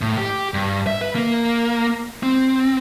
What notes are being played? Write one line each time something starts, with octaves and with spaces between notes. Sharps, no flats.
A2
G4
G2
E5
B4
A#3
C4